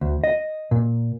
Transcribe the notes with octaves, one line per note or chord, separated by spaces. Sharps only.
D2
D#5
A#2